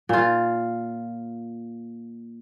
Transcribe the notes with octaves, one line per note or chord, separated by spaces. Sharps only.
A#2 F4